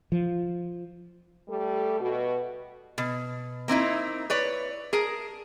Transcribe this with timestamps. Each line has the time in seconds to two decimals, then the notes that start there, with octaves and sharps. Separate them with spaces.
0.12 F3
1.48 G3 A3 A4
1.99 B2 F#4
2.98 B2
3.68 A#3 C4 D#4 E4
4.30 B4 C#5 D5
4.93 G#4 A#4 A5